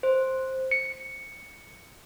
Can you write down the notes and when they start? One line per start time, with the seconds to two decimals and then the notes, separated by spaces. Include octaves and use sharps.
0.03 C5
0.71 C#7